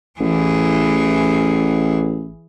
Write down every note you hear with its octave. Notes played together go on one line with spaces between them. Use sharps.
A1 E3 G#4